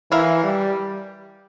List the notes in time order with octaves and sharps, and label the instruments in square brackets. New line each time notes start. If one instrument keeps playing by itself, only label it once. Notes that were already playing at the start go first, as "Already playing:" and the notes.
[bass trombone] E3 [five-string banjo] E4 A#4 F5
[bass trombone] G3